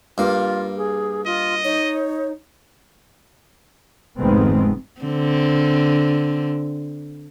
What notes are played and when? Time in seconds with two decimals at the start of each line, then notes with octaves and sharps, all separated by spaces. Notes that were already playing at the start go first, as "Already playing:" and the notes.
0.18 G2 A#3 F4
0.77 G#4
1.26 F4 D#5
1.64 D#4 C#5
4.19 F1 G#2 D#3 G#3 B3 C4
5.02 D3 C4